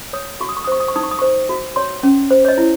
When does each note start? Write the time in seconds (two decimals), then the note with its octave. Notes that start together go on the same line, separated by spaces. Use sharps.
0.13 C#5 D#6
0.41 F#4 C#6
0.49 D#6
0.57 C#6
0.65 D#6
0.67 C5 C#6
0.80 D#6
0.88 C#6
0.96 D#4 D#6
1.03 C#6
1.11 D#6
1.19 C5 C#6
1.49 F#4
1.76 C#5 C6
2.03 C#4
2.31 C5
2.45 C#5
2.48 D#5
2.58 E4